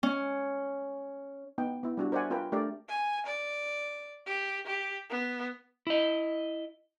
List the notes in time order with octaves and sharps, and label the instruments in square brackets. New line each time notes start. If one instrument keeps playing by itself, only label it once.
[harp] C#4
[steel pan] B3 D#4 G5
B3 E4
G3 D4 F#4
A#4 C5 D5 E5 F#5 G#5
C4 F4 A#4 B4 G5
A3 D4 G4 A#4 D5
[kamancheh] G#5
D5
G4
G4
B3
[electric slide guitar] E4 D#5